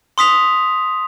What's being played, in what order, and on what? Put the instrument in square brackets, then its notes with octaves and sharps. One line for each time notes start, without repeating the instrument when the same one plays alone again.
[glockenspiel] C6 D#6 B6 F7